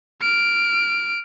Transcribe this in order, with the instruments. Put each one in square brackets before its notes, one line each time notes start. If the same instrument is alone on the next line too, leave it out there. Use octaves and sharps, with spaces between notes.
[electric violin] F6 D7